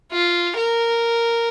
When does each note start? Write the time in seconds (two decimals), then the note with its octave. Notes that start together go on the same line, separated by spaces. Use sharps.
0.12 F4
0.57 A#4